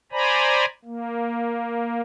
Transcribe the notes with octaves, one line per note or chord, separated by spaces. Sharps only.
C5 D5 G#5 A#5 B5
A#3